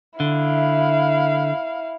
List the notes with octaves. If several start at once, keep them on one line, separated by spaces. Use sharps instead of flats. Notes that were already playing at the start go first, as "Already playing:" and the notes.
D3 E4 F5